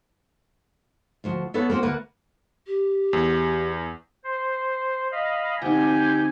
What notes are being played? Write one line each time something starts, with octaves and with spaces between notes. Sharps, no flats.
D2 F3 F#4
B3 A4 B4 C#5 F#5
A#3 C4 F#4 C5
D2 A#3 A#4 B4 F#5
G4
E2
C5
D#5 F5 B5
D2 C4 D#4 G4 G#5 G6